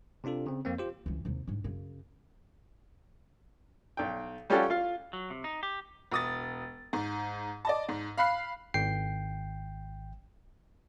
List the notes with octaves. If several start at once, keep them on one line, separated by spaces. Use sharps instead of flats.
C3 C4 D4 F4 A4
C#3 C4
F2 A#3 C4
F4 G4 C5
C#2 E3
D#2 C3
G#2 D4
F#2 C#3
B1 G5
G3 C#4 F4 G4 A4 F#5
F4 F5
F#3
C3
D#4
G4
E1 D#6 A6
G#2
D5 D#5 A5
G#2
F5 B5 F#6 C7
G#1 G5 C7